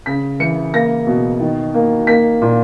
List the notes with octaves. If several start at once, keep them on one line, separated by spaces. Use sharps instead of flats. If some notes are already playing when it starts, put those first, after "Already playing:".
C#3 B6
E3 C#7
A#3 A#6
B2
D#3
A#3
A#3 B6
A#2